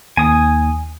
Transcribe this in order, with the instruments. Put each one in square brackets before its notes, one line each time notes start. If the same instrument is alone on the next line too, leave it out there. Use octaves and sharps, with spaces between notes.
[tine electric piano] D#2 [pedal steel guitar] G#5 D#6